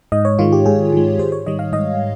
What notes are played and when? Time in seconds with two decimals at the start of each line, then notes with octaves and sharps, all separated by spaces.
0.12 G#2 D#5
0.25 C#5
0.39 D#3 G#3 F4
0.52 G4
0.66 G#2 G#4
0.92 D#3 G#3
1.19 G#2 C5
1.32 C#5
1.46 D#3 G3 D#5
1.59 F5
1.72 G#2 D#5